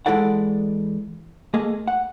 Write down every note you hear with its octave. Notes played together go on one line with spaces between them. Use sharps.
E3 G#3 E4 A4 D5 F#5
A3 A#3 G#4 D#5
F#5